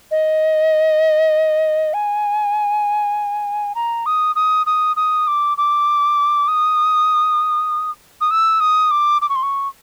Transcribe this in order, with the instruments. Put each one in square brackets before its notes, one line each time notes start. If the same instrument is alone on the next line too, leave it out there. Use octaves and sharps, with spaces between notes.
[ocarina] D#5
G#5
A#5
D#6
D#6
D#6
D#6
D6
D6
D#6
D#6
E6
D#6
D6
D6
C#6
C6
C#6